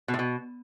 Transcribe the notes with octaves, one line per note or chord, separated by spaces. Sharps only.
B2
A2
B2